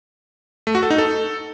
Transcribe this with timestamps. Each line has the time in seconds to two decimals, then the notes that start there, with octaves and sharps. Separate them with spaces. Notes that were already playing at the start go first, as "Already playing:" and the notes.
0.67 A3
0.75 F#4
0.83 A4
0.90 D#4
0.98 A4